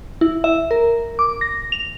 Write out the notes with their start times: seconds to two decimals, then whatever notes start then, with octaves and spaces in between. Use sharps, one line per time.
0.21 E4
0.44 E5
0.71 A#4
1.19 D6
1.41 A#6
1.72 F7